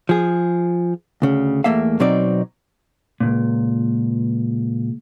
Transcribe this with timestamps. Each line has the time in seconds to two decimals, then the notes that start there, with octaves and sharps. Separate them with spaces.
0.09 F3 G#4
1.22 D2 C#3
1.64 E2 A3 A#3 E5 F5
2.00 B2 F#3 C4 D#4 D5
3.20 C#2 F#2 A#2